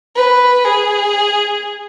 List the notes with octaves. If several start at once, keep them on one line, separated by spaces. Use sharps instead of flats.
B4
G#4